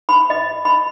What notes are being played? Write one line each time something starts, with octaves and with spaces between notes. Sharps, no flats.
B5
D#5
B5